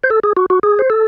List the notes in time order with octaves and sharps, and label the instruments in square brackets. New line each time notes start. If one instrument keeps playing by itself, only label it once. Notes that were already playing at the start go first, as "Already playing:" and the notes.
[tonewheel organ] C5
A4
G#4
F#4
F#4
G#4
C5
A4